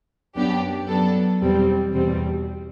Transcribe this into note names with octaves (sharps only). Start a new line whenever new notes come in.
F#2 F#3 B3 D4 G4
F#2 F#3 B3 D4 A4
E2 B2 G3 C4
E2 B2 G3 C4